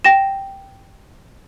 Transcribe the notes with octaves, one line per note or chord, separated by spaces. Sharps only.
G5 A#6 E7